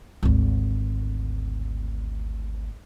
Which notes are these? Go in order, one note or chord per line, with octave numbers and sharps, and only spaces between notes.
G#1 D2